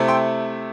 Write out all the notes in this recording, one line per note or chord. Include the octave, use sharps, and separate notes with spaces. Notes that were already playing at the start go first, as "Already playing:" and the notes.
Already playing: C3 A3 C4 E4
G5 C6